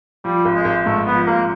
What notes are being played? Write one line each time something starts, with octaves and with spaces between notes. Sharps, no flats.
F3 G3
G#1
G#3
G#1
G#2 A3
F3 B3
G#1 A#3